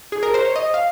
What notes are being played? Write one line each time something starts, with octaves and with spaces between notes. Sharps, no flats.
G#4
A#4
C5
C#5
D#5
F5